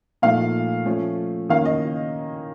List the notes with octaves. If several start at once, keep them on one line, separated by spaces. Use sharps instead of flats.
A#2 F3 A3 D#4 F5
F3 A3 C#4
D#3 A#3 C#4 F5
D#5